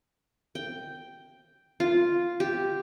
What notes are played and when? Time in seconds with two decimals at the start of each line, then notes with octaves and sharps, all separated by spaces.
0.55 G5
1.80 F4
2.40 G4